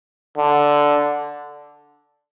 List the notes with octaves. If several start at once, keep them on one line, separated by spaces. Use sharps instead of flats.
D3